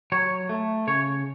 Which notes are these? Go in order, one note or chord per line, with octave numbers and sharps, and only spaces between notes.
F#3 C#5
A3
C#3 C#5